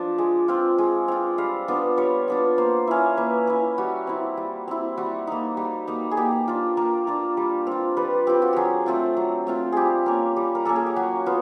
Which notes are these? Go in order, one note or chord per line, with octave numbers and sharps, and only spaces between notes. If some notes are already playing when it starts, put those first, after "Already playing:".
Already playing: F3 D4 F4
G#3
C4 F4
G#3
C4 F4
G3 F5
B3 D4 F4
G3 C#5
B3 D4 F4
A#3 C5
C#4 E4
A#3 B4
C#4 E4
G3 F#4
C4 E4
G3
C4 E4
G3 F#4
A#3 D#4
G3
A#3 D#4
G#4
A#3 G4
D4 F4
A#3 A#4
D4 F4
G3
C4 F4
G3 B4
C4 F4 G4
F#4
F#3 G4 G#4
A3 C4 F4
F#3
A3 C4 F4
G3 G4 G#4
A#3 C#4
G3
A#4
A#3 C#4 A4
G#4
G4
F#3 F#4
B3 F4